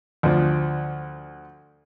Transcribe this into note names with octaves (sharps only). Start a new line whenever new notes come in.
D2 F3 D5